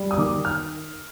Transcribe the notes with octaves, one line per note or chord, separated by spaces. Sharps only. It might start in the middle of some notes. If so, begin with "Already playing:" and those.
Already playing: G3
D#6
D#3 D6
F6